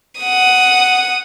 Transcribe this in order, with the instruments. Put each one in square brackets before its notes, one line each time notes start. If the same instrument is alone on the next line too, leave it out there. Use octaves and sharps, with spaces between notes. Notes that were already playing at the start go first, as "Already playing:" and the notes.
[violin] F#5 D#6